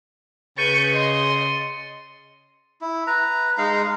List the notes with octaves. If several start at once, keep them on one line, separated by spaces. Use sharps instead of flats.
C#3 B4 C#6 G6 A6 C#7 D#7
D#5 C6
E4
B4 A#5
G#3 D#4 F5 A#5